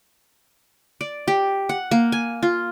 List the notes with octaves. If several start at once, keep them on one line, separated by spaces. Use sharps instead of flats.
D5
G4
F#5
A#3
G#5
F4